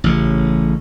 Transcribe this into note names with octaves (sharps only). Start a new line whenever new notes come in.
A1 C#3